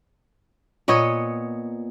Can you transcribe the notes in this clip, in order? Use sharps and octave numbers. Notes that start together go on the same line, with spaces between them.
A#2 B3 C#5 D#5